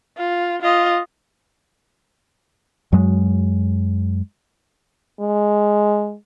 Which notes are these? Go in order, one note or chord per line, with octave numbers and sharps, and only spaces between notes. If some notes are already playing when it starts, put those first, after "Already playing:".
F4
F4 D#5
F#2 F#3 G#3
G#3